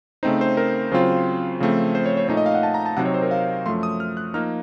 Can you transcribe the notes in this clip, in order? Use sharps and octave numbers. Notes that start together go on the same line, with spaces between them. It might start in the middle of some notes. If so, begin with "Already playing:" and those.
C#3 A3 C4 D#4 C5
C5
A#4
C#3 F#3 C4 F4 C5
C#3 F3 A3 C4
C5
C#5
C#5
A#2 A3 D#4 C#5
D#5
F5
F#5
A5
A#5
A5
C3 F#3 C4 D#4 F#5
C#5
C5
A#4
F5
F#2 F3 A3 C6
D#6
F6
F#6
F3 A#3 D#4 F6